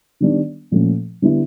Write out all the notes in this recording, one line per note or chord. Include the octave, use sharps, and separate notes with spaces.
D#3 G3 B3 D4
A#2 F3 A3 C#4
D3 G3 B3 E4